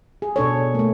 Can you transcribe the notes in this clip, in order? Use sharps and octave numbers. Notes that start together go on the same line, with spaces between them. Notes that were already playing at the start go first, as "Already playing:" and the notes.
G#4
B2 D4 A4 C#5
A3 A#3